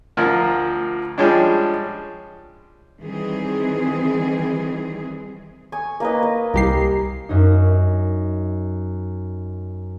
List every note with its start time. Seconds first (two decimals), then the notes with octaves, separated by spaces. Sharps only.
0.17 D2 F3 F4 A#4
1.18 F3 G3 G#3 C#4 D4
3.00 D#3 E3 G3 C4 G#4
5.72 G#5 C#6 D#6
6.00 A#3 B4 D#5
6.23 D#5
6.54 C2 G4 A#4 C7
7.29 F#2 D#4